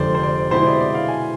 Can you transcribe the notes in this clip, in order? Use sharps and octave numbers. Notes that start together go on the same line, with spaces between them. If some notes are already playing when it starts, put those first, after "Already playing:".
Already playing: F1 F2 D3 G#3 C5 D5
C5
D5
B2 G#3 C4 E4 G#4 C5
D5
D5
F5
G#5